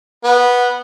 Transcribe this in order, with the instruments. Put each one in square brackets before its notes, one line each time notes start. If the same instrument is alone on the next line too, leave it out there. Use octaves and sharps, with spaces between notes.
[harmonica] B3